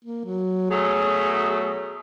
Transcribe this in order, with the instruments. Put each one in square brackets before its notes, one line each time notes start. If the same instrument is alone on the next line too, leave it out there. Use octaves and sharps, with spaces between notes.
[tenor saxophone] A#3
F#3
[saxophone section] B2 F#3 A3 [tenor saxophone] G#4